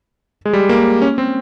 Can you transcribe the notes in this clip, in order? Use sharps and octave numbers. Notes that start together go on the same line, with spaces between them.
G#3
G3
A#3
C#4
C4